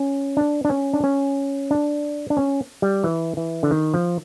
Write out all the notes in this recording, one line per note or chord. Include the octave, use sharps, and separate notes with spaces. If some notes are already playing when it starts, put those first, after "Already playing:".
Already playing: C#4
D4
D4
C#4
D4
C#4
D4
D4
C#4
G3
E3
E3
D3
D#3
F3